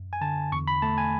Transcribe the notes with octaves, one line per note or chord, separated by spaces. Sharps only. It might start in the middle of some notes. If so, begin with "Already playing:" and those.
Already playing: F#2
G#5
D3 A5
E2 C#6
B5
A3 A5
G#5